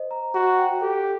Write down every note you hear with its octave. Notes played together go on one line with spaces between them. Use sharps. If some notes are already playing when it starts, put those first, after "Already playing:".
Already playing: C5 D#5
A#5
F#4 A#5
G5
G4 A4